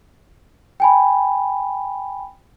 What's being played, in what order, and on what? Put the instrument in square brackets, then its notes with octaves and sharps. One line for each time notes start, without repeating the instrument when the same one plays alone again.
[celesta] G5 G#5 B5